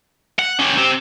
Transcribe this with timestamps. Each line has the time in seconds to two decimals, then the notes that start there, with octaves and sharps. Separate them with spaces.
0.39 F#5
0.60 C#4 G4
0.78 C4 G4